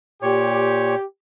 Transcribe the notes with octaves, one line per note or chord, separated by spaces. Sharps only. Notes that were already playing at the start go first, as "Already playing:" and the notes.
A#2 G4 C#5